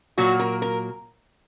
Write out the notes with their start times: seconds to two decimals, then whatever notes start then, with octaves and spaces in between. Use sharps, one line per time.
0.18 A#2 F#3 A#3 F#4
0.40 A#4
0.62 A#4